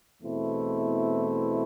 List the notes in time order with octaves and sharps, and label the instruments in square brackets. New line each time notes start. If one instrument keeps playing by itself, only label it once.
[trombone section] E2 B2 A3 C4 E4